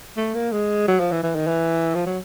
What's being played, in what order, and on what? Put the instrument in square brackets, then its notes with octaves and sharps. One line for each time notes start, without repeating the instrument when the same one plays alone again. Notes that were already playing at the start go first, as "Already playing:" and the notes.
[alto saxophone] A3
A#3
G#3
F#3
F3
E3
E3
D#3
E3
F3
F#3